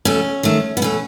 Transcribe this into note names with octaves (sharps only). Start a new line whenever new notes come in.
B2 A3 C#4
D#3 A3
B3
B2 A3 C#4